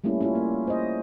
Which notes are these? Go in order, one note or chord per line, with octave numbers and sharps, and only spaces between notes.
G3 A3 A#3 C#4 E4
C#4 E4 F4
A#3
C5 D#5